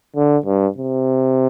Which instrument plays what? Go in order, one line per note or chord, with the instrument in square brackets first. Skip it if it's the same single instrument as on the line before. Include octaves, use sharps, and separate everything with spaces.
[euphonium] D3
G2
C3